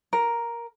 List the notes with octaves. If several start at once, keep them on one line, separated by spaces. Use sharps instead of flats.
A#4